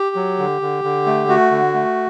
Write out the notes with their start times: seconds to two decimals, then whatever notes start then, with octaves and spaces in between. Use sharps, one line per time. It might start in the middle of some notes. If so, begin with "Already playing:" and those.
Already playing: G4
0.16 F#3
0.39 D3
0.62 D3
0.84 D3
1.06 A3
1.28 A3 F#4
1.51 D3
1.74 A3